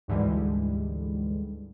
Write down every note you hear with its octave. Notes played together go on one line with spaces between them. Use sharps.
D2 G#2 D3 E3 G3 G#3